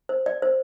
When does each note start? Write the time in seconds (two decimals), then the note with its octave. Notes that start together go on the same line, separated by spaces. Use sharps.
0.09 C5
0.26 D5
0.42 C5